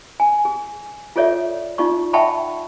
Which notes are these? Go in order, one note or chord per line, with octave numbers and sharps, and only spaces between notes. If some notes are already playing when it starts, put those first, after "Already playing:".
G#5
G#4
F4 G#4 A4 C#5 D5 E5
D#4 F4 D5 C#6
E5 F#5 G5 A5 B5 C#6